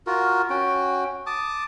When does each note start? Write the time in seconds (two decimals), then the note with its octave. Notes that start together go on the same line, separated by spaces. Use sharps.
0.07 F4 F#4 A#4
0.50 C#4 F#4 G5
1.26 A5 D6 D#6